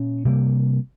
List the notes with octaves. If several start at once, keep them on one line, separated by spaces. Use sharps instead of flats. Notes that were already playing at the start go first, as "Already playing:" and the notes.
Already playing: A#2 C#4
C3 G3 A#3